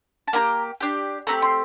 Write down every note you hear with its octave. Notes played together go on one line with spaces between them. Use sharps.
A5
A#3 E4 G4 A#5
D4 G4
A3 C4 G4 A#5
C6